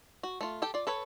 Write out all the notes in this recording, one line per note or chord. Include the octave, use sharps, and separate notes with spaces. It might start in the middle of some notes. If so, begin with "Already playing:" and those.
F#4
A3 F4
G4 A4 G5
F4 D5
A4 B4 C#5